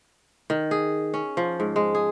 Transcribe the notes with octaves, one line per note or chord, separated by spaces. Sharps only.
D#3
G#4
C#4
F3
G#2
G#3
G#4